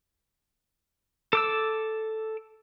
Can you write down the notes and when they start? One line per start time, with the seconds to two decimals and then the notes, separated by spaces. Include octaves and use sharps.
1.33 A4 D6 E6